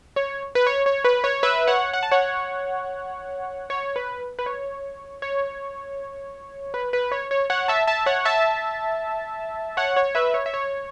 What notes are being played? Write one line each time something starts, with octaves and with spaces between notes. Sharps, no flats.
C#5
B4
C#5
C#5
B4
C#5
B4 E5
C#5 F#5
F#5
A5
C#5 F#5
C#5
B4
B4
C#5
C#5
B4
B4
C#5
C#5
C#5 F#5
E5 A5
E5 A5
C#5 F#5
E5 A5
C#5 F#5
C#5
B4 E5
C#5
E5
C#5